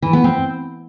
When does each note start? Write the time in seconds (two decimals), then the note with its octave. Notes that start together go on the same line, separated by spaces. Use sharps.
0.02 E3
0.13 B3
0.24 C4